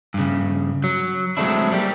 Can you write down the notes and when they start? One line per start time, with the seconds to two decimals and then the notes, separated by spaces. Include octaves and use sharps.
0.14 G2 C#3
0.84 F#3
1.37 F#3 G#3 A3 C4 D4 E4
1.72 G3 A#3 G4